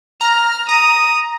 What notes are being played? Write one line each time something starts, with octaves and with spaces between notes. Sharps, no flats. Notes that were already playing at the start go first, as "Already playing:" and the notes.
A#5 F6
A#5 D#6